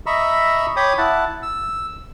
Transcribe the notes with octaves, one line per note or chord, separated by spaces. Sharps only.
D#5 E5 A#5 B5 C#6 E6
C#5 G5 B5 D6 D#6
E4 F#5 A5
E6